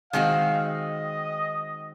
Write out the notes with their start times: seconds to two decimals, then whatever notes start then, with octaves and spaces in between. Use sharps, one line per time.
0.13 D#3 G#3 C4 F#4 F5
0.67 D#5